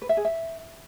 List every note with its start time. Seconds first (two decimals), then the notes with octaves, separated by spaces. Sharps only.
0.02 B4
0.09 E5
0.17 G#4
0.25 E5